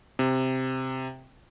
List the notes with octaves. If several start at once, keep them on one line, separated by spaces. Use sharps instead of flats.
C3